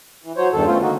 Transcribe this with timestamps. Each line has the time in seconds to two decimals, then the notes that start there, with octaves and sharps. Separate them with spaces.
0.24 E3
0.37 F#3 C5 C#5
0.54 E2 G2 D#3 A4
0.66 A3 C4 C#4 F4
0.81 D3 A#3 D#4 F#4